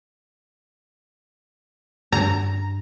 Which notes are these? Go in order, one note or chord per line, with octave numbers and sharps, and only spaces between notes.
G2 A#5